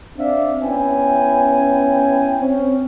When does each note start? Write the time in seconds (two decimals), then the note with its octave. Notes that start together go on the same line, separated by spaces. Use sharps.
0.18 C4 D4 D5 E5 F5
0.61 B3 C#4 E4 G5 G#5
2.41 C4 C#4